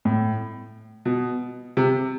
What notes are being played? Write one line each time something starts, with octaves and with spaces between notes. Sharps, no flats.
A2
B2
C3